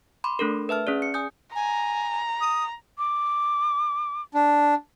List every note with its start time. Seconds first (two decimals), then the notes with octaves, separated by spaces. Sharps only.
0.24 B5 C6 D6
0.39 A3 D4 A4 A#4
0.69 B4 E5 A5 F6
0.87 C#4 G#4 D5
1.02 C#7
1.14 G#5 D#6 G6
1.55 G#5 A#5
2.41 D#6
2.98 D6
4.34 D4